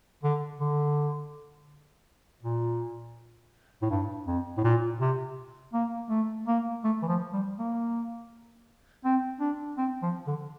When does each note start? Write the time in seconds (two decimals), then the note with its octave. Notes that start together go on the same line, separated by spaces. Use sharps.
0.23 D3
0.60 D3
2.43 A#2
3.82 A2
3.90 G2
4.27 F2
4.58 A2
4.64 A#2
5.01 C3
5.73 A#3
6.10 A3
6.48 A#3
6.84 A3
7.02 E3
7.08 F3
7.33 G3
7.58 A#3
9.05 C4
9.40 D4
9.78 C4
10.02 F3
10.27 D3